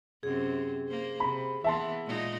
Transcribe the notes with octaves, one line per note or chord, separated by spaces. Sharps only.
F#2 C3 C4 G#4
A#3 C5
C3 B5
E3 A#3 B3 E5 A5 C6
A#2 G#3 D#4